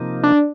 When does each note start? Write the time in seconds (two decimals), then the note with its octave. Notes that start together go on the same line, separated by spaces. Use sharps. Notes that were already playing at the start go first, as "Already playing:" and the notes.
Already playing: C3 F3 A#3 D#4
0.23 D4